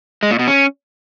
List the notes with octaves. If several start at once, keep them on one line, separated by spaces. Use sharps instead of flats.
G#3
A#2
B2
C#4